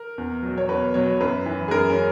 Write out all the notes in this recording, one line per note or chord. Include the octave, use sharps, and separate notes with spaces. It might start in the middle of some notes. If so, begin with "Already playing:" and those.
Already playing: A#4
E2
B2 F#3
C#5
E2 B4
B2 F#3 C#5
F#2 B4
E3
G#4
F#2 A#4
C#4